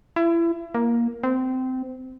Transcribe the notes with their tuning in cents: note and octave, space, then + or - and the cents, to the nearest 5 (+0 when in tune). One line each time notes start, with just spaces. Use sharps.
E4 +30
A#3 +10
C4 -20